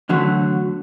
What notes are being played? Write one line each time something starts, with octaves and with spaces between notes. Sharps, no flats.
E2 D3 F#3 A3